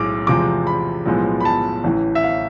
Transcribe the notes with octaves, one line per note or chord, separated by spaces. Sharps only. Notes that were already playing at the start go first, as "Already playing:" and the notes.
Already playing: B1 A2 G#3 D6
E2 C3 F3 G#3 D6
B5
B1 A2 F3 G#3 B3
B5
A5
A1 A2 E3
E5
F5